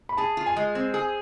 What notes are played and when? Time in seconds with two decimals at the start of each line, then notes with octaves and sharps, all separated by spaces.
0.09 B5
0.17 G#4 A5
0.37 F4
0.46 G#5
0.56 G#3
0.75 C4
0.94 G#4